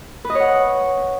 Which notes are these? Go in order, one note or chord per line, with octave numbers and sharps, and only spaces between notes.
B4
D#5
C#5
F#5